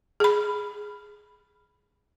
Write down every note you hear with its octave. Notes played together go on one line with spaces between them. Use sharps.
G#4 B5